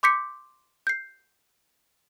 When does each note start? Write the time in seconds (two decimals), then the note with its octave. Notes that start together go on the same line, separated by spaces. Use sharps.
0.03 C6 D6 G6 B6 C#7
0.87 G6 C7